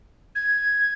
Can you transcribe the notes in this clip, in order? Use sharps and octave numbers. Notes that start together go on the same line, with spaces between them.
G#6